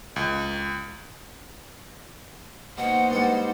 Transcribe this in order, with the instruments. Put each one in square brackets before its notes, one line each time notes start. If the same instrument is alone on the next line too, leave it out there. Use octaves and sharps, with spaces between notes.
[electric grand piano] C#2
[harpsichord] B2 [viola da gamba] A#3 D#4 C5 [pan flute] F#5
[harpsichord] G2 G3 G#3